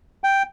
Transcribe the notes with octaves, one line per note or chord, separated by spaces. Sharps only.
G5